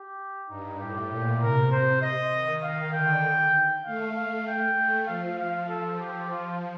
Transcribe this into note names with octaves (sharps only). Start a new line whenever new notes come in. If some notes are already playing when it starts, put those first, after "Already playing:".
Already playing: G4
G2 D#4
A2 G4
A#2
C3 A#4
C5
D#5
D#3
D#3 F5
D3 G5
A3 F5
F5
G5
A3
F3 F5
F5
A4
G4
F4